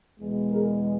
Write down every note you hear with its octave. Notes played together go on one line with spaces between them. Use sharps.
E2 B2 G#3
G#4 A#4